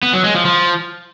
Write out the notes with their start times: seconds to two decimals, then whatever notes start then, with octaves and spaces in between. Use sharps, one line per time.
0.03 B3
0.13 F#3
0.24 G#3
0.35 F3
0.45 F3